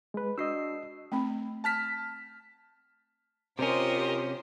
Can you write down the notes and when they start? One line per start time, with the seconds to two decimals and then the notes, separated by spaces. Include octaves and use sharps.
0.14 G#3 B4
0.38 D4 F#4 D#5 E6 C7
1.12 A3 C4 B5
1.64 A5 F6 B6
3.59 C3 C#4 F4 G4 A#4 C5 D#5